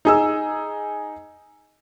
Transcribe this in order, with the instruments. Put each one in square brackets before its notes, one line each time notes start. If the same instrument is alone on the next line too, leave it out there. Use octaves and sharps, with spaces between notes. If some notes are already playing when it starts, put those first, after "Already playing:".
[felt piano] D#4 G#4 E6